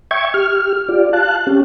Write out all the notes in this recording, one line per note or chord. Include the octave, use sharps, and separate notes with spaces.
E5 G5 C#6 G#6
G4 F6
F4 G4 D5
F5 A5 F#6
C#4 G4